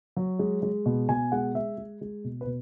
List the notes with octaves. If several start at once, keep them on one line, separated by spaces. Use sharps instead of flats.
F#3
G#3
G#3
B2
B2 G#5
G#3 F#5
G#3 E5
G#3
G#3
B2
B4
B2